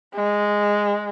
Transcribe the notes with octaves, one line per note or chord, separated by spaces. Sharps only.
G#3